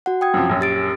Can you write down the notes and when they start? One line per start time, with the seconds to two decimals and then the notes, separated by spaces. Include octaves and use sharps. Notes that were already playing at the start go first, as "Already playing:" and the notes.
0.06 F#4 F#5
0.21 G5 D#6 G#6
0.34 F#2 C3 F3
0.50 A#1 F#2 C#4
0.61 G4 A6 D7